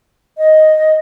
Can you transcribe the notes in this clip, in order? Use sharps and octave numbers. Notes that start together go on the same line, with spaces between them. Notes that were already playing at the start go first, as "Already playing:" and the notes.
D#5